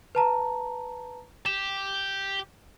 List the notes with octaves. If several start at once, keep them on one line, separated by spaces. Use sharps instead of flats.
B4 A5 A#5
G4 E7